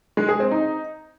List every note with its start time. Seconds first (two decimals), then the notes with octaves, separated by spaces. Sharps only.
0.17 G#3
0.29 G#4
0.40 C4
0.51 D#4